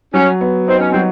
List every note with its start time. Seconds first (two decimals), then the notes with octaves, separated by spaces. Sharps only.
0.14 F#3 C#4
0.41 B3
0.68 C4 D#4
0.79 C#4
0.91 F#3 C4